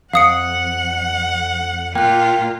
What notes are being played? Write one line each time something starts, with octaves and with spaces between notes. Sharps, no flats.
F2 F5 F#5 D#6 C#7
A#2 A#3 F4 G5 F#6